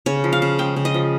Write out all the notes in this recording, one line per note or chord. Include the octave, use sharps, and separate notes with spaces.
C#3 C#5
F3
F5
C#3
G#3 G5
C#3
D#5
F3